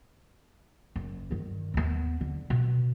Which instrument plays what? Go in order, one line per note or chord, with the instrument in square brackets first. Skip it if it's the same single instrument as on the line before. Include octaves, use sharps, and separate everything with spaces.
[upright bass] F#1
G2 D#3
D#2 B3
D3
B2